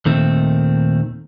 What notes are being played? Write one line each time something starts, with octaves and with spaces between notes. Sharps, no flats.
D#2 A#2 D#3 A3 C4